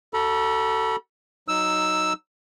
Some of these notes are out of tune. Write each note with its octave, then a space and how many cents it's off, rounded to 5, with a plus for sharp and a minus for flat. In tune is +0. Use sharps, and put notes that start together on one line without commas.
F#4 +35 A4 +15 B5 -40
F#3 +0 D#4 +0 E6 +0